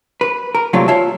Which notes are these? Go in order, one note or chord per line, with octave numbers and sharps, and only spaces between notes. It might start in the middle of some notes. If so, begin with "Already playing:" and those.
B4
A#4
C3 F#3 A3 A#3 D4 F4
F4 C#5 E5 A5